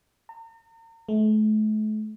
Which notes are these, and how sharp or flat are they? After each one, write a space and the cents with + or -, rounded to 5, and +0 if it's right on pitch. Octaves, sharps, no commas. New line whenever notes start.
A#5 -40
A3 -40